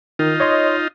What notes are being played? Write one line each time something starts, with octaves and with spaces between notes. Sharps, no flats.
D#3 D#4 F4
C#5 D#5 C6